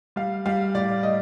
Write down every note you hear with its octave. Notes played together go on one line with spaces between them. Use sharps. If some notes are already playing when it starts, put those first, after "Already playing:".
G3 F5
G3 F5
A2 D5
A2 D#5